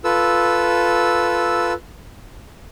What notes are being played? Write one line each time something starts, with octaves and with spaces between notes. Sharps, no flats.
F4 A4 B4 E6